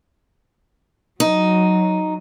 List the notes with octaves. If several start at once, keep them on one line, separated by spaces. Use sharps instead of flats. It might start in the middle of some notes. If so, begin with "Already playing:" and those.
F#3 D#4